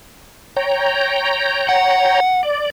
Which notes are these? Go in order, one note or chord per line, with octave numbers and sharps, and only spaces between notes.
C#5 G5 A#5
F#5
D5